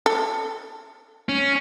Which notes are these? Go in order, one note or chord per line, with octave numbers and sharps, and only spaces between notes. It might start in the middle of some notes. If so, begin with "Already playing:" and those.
A4
C#4